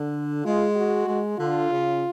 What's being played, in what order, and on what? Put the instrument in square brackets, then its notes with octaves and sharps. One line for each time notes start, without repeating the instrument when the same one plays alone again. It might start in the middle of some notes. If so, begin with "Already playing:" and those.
Already playing: [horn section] D3
[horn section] G#3 [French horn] F4
[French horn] F#4
[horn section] G#3
[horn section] D3 [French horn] F4
[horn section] C#3